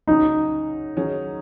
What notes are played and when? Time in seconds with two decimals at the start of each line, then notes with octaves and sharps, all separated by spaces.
0.07 C#3 F#3 C#4 D#4
0.97 D#3 F#3 C#4 G#4